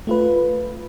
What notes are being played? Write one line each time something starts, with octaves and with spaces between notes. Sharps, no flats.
A3 F4 B4